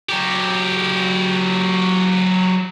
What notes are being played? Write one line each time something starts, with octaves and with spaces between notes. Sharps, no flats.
F#3 G4